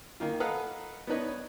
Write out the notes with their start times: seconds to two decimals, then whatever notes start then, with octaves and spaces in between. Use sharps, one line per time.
0.20 D#3 A#3 F4
0.40 A4 B4 D#5 F5 F#5 A#5
1.07 B3 D4 D#4 B4 C#5